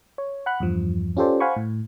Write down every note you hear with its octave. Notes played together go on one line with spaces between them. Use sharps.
C#5
F#5 B5 F#6
E2 G2 F3
C#4 F4 G4 A4 C5 D5
C5 F5 F#5 G#5 B5 C#6
A2